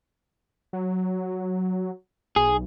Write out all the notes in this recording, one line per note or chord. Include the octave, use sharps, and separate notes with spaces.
F#3
B1 G#4